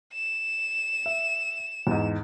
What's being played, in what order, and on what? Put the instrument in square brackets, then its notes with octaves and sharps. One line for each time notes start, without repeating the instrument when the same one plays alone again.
[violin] E7
[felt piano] E5
E2 G#2